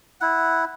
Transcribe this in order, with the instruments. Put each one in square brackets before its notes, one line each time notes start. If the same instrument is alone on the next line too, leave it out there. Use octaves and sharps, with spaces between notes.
[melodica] E4 F#5